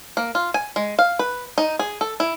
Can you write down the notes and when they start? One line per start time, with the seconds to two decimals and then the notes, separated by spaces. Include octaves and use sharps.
0.17 A#3
0.35 F4
0.54 G#5
0.76 G#3
0.99 F5
1.19 B4
1.58 D#4
1.79 G#4
2.01 A4
2.20 E4